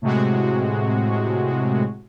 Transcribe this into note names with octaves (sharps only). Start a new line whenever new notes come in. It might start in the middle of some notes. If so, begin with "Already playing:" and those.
A2 C3 G#3 F#4